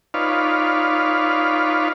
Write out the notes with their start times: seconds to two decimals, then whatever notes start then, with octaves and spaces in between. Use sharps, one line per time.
0.14 D#4 F4 B4 C#5 D5 F5